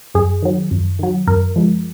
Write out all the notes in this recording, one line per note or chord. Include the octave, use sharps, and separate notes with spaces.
F#2 G#4
D#3 F#3
F#2
D#3 F#3
F#2 A#4
F3 G#3